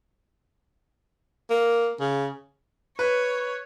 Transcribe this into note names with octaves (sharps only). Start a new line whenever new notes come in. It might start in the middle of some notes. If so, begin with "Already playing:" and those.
A#3
C#3
B4 C#5